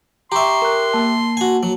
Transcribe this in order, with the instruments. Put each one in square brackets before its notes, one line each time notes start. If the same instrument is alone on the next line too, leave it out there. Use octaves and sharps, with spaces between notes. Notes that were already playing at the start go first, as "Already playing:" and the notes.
[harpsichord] G4 E5 [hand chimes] A#5 C#6 [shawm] C6
[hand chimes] A#4 F#6
A#3 A5
[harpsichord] F#4 G#5
F#3